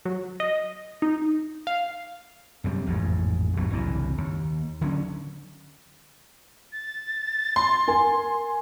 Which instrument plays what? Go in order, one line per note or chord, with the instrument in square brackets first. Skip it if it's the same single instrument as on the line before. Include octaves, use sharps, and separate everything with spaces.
[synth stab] F#3
D#5
D#4
F5
[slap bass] F#2 C3 G3
A1 F2 G#2
E2 G2 B2 F#3
F#1 C2 F#2 E3
D#2
D3 F#3 B3 C#4
[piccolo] A6
[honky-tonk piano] C6
[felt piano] A#4 G#5